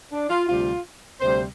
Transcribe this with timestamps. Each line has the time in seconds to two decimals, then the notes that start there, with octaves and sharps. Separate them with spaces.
0.11 D4
0.30 F4
0.48 D2 C3 G3 F4
1.21 D2 C3 G3 C5